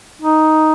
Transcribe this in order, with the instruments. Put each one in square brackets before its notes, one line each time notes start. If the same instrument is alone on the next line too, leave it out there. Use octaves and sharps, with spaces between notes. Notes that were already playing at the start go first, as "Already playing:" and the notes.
[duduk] D#4